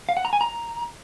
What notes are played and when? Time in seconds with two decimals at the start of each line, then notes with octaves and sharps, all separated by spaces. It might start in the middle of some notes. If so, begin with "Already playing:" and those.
0.09 F5
0.17 F#5
0.25 A#5
0.33 G#5
0.41 A#5